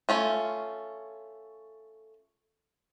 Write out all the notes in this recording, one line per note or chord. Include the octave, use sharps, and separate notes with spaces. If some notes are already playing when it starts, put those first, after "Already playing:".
A3 C#4 F4